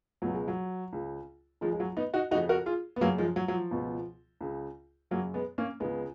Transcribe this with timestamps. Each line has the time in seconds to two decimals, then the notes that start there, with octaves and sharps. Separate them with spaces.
0.22 C#2 B2 F#3
0.34 G#3
0.48 F#3
0.93 C#2 C#3
1.61 C#2 C#3 F3 G#3
1.72 G#3
1.80 F#3
1.97 B3 D#4
2.14 D#4 F#4
2.31 C#3 D#4 F#4
2.35 F2
2.49 F#4 A#4
2.66 F4 G#4
2.96 B3
3.01 F#2 C#3 F#3 A#3
3.18 F3 G#3
3.36 F#3
3.48 F#3
3.54 F3
3.71 C#2 B2
4.41 C#2 C#3
5.11 F#2 C#3 F#3 A#3
5.34 G#3 B3
5.58 A#3 C#4
5.80 C#2 C#3 G#3 B3